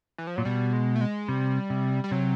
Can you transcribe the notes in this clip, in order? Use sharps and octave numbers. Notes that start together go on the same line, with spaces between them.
E3
F3
A#2 F#3
B2 G3
G#3
A3
G#3
C3 G3
C3
G3
C3 F#3